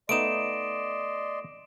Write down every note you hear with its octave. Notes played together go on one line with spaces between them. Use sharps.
A3 B3 D#4 D5 D#5 C6 D7 E7